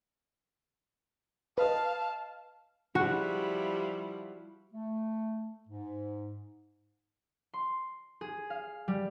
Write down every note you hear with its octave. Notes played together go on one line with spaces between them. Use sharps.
B4 D#5 F5 A5
F3 G3 E4 F#4
A3
G#2
C6
G#4
F5
G3